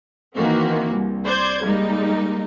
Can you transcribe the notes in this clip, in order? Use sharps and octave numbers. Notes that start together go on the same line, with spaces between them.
D#3 E3 A#3 C4 F#4
C2
C5 D5 G6 G#6
G3 G#3 A#3 D#4